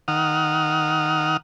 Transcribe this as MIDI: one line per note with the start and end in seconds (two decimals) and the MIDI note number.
0.08 1.37 51
0.08 1.37 78
0.08 1.37 87
0.08 1.37 89